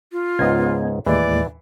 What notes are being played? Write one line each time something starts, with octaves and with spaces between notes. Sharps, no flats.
F4
C#2 G#2 B3 D#5 G#6
D#2 A2 E3 G#3 D5